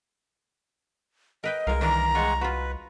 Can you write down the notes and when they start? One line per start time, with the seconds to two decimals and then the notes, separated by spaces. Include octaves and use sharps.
1.44 A#4 B4 D#5 G5
1.67 C2 G#3 A#4 F5
1.81 D#3 E3 D4 A#5
2.15 G#3 F4 F#5 C#6
2.41 F4 F#4 B4